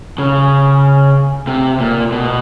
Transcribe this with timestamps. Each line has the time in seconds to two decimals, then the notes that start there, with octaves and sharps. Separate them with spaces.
0.18 C#3
1.47 C3
1.80 A#2
2.12 B2